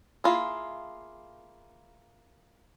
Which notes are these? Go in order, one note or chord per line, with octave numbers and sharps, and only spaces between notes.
A#3 E4 F4 G#4